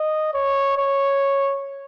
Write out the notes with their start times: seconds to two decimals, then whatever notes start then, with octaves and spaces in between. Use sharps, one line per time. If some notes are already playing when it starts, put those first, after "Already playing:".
Already playing: D#5
0.34 C#5
0.78 C#5